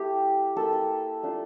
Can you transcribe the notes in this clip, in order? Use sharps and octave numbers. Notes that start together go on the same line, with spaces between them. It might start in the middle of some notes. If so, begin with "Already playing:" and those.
Already playing: A3 E4 G4
A#3 E4 A4
A4
A3 D4 F4